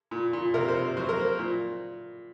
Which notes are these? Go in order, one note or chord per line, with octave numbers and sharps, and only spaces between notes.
A#2
A#2
C3 A#4
C5
C3
F#3 C5
A#4
A#3 C5
A#2